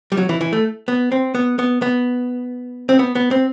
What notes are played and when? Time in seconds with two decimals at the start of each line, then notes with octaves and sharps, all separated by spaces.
0.12 G3
0.17 F#3
0.29 E3
0.41 E3
0.53 A3
0.88 B3
1.12 C4
1.35 B3
1.59 B3
1.82 B3
2.89 C4
2.99 B3
3.15 B3
3.31 C4